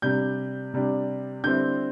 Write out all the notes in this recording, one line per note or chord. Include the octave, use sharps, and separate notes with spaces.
C3 G3 D4 G6
C3 G3 D4
D3 G3 C4 E4 G6